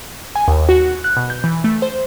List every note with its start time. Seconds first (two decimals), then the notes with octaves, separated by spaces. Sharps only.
0.35 G#5
0.48 D#2
0.69 F#4
1.04 F#6
1.17 B2
1.30 G6
1.44 E3
1.64 A3
1.82 C5